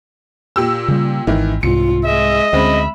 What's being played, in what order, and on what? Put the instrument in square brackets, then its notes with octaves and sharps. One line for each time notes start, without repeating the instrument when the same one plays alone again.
[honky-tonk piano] A#2 G4 E6
[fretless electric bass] C#3 G3
[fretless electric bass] G#1 [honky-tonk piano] D#3 E3
[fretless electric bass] C2 G#2 [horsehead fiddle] F4 [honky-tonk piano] C#7
[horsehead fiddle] G#3 E5 [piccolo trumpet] D#5
[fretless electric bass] D2 [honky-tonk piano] G#3 C4 C#4 [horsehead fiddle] E5 B5